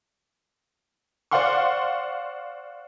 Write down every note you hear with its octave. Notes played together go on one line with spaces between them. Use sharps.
C5 D5 F5 F#5 C6 C#6